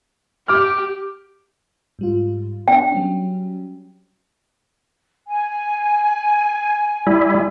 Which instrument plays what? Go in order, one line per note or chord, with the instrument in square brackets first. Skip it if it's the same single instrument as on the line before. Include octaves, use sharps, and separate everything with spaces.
[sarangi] G4 [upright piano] D6 F6
[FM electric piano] G#2 G3 F4
[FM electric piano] B3 D4 [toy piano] G5
[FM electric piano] F#3 G3 C#4
[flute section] G#5
[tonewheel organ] G3 E4